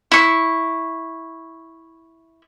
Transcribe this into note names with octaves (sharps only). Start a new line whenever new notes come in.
E4 C#6